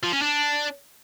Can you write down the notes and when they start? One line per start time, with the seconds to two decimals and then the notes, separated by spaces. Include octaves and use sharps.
0.03 F3
0.13 C#4
0.22 D4